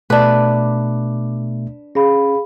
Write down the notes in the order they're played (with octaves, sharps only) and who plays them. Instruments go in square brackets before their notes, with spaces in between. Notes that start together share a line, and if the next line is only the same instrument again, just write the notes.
[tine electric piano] B2 A3 E5 [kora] D4 B4 [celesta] D6
[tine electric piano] C#4 [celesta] G#4 F5 B5